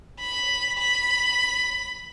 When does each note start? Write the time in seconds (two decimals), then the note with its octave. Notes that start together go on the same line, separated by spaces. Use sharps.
0.20 B5
0.79 B5